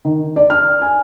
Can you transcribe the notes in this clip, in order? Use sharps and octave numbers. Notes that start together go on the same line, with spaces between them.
D#3
D5
F6
G#5